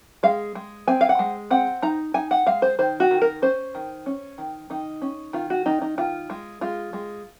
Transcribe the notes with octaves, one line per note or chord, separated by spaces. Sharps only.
G#3 F5
G#3
C4 G#5
F5
F#5
G#3
C4 F#5
D#4 A#5
D#4 G#5
F#5
G#3 F5
C5
D#3 C5
F#4
D#3
A#4
C#4 C5
D#3
C#4
D#3
D#3 D#4
C#4
D#3 F4
F#4
D#3 D#4
D#4
D#3 F4
G#3
G#3 F4
G#3